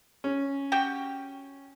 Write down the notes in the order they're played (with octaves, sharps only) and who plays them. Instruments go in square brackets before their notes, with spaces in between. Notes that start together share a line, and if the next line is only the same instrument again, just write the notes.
[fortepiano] C#4
[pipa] F#4 G4 G5